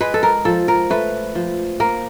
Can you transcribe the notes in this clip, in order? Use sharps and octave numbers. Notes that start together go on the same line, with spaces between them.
G#3 B4
A4
A#4
F3 A4
A#4
A3 B4
F3
A#3 A#4